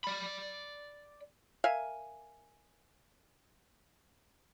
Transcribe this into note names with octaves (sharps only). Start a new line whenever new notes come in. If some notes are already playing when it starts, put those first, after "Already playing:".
D5 B5
A#4 E5 F5 G#5